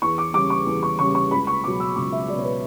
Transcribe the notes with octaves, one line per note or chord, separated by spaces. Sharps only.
E2 C#6
D6
C#3 G3 D6
C#6
E2
C#6
C#3 G3 C#6
C#6
C#2 B5
C#6
B2 F#3 D6
E6
C#2 D6
E5
B2 F#3 D5
C#5
B4